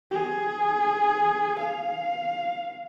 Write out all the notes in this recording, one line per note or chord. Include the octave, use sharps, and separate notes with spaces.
G#4
F5